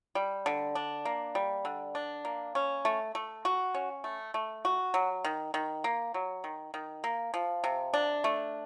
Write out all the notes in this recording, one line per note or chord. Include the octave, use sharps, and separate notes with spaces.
G3
D3
D4
A#3
G3
D3
D4
A#3
C#4
A3
A3
F#4
C#4
A3
A3
F#4
F#3
D#3
D#3
A#3
F#3
D#3
D#3
A#3
F3
C3
D4
A3